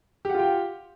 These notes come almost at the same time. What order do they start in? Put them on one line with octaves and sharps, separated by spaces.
G4 F#5 F4 G5